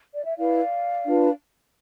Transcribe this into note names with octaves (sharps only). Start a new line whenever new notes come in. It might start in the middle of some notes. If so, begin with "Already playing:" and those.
D5
E5
E4 B4 D5 F5
D4 F4 B4